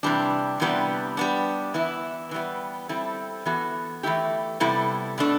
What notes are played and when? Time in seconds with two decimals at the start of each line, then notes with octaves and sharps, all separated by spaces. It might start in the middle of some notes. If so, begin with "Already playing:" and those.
0.03 C3 E3 G3 D4
0.60 C3 E3 G3 B3 D4
1.17 G3 B3 D4
1.74 E3 B3 E4
2.31 E3 G3 B3
2.89 G3 C4 E4 A4
3.45 E3 B3 F#4 A4
4.03 E3 A3 E4 G4
4.60 C3 G3 B3 E4 A4
5.18 B2 A3 D4 A4